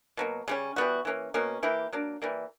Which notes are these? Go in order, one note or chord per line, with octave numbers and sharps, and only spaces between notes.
B2 F#3 A#3
C#3 G3 C#4
E3 G3 B3 F#4
E3 A#3 C#4
B2 A#3 C#4
E3 A#3 E4 G4
F#3 A#3 D4
E3 G3 A#3